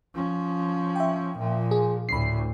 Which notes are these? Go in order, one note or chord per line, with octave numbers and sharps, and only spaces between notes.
F3 C#4
E5 G5
A#2 F3
G#4
D2 A2 B5 C7